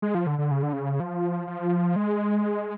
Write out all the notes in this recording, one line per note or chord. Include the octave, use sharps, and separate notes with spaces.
G#3
F3
D3
D3
C#3
D3
C#3
F3
F3
G#3